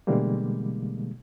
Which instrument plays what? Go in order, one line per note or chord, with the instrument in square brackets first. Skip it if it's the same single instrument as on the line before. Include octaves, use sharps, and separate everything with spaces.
[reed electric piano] B2 D3 E3 G3 G#3 A#3